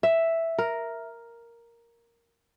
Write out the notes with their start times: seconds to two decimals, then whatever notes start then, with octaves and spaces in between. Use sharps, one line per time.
0.03 E5
0.58 A#4